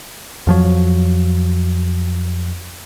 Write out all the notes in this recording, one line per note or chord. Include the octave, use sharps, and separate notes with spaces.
F2 F3 F#3